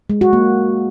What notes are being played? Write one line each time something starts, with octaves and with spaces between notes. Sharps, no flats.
G#3
F#4
A#3